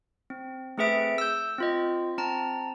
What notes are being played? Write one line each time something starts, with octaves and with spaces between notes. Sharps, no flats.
C4
A3 C4 G#4 B4 E5 D7
E6 G6
C4 F4 D#5
C4 A5 A#5